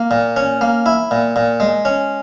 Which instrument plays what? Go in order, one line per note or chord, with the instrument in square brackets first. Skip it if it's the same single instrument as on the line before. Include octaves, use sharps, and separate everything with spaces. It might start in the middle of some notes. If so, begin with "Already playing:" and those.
Already playing: [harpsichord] A#3
A#2
C#4
A#3
E4
A#2
A#2
G#3
C#4